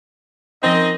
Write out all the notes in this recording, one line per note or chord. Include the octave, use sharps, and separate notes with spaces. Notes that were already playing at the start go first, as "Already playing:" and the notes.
F3 C4 C#4 D#4 A#4 D#5